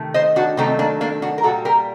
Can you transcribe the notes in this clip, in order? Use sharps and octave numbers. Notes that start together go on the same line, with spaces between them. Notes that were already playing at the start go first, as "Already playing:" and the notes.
Already playing: C3 D#3 A3
C5 D#5
D4 F#4
C3 D#3 F#3 A3 C4 D#4
A#3 D4
A#3 D4
D4 F#4
A#4
A#2 G3 F#4 A4
G4 A#4